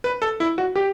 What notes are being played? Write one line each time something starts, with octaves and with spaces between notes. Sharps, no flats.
B4
A4
E4
F#4
G4